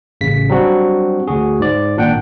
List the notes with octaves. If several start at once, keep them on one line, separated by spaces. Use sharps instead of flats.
A1 C#3 B6
F#3 G3 C4 D4 F#4
D2 F#4 G#4
G#2 D5
G#1 A#2 D4 F#5 G5